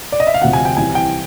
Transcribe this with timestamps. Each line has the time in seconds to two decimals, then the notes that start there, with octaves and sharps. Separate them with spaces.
0.12 D5
0.20 D#5
0.27 E5
0.34 F5
0.42 D2 C3 F3 F#5
0.53 G#5
0.65 G5
0.77 C2 C3 E3 G#5
0.95 G5